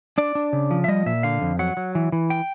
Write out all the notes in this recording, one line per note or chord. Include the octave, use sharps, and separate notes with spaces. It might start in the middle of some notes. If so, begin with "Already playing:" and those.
D4 D5
D4
C#3
F3
E5
G3 D#5
A#2 E5
D3 F5
F2
F#3 F#5
F#3
E3
E3
G5